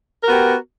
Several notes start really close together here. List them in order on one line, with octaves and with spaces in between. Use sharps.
A#4 F#4 B3 G4